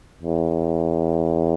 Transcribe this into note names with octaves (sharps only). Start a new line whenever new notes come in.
E2